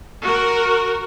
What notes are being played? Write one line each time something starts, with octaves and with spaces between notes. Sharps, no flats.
F#4 A#4